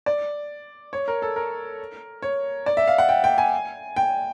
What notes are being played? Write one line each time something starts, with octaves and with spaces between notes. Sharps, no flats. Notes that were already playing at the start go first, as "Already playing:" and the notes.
D5
C#5
A#4
A4
A#4
C#5
D5
E5
F5
F#5
G5
G5
G#5
G5